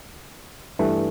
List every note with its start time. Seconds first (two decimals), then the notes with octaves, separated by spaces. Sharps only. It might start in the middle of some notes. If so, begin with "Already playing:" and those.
0.79 G2 E3 A3